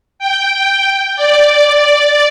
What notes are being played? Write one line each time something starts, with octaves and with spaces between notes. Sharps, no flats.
G5
D5